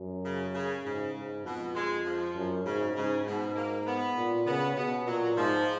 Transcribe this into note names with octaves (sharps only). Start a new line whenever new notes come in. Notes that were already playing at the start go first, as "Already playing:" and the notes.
Already playing: F#2
C#3
C#3
G#2 C#3
G#2
F2 B2
G#3
F3
F#2
G#2 C#3
G#2 C#3
G#2 B2
A#3
B3
A#2
C#3 B3
B2 B3
A#2 F#3
G#2 F3